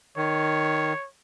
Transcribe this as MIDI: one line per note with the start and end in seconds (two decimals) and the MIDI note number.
0.17 0.93 51
0.17 1.06 73